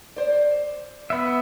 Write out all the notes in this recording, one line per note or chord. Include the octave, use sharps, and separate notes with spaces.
C5 D5
B3 E5